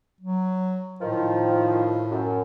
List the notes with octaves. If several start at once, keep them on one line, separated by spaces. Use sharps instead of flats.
F#3
A2 D#3 F3
F#2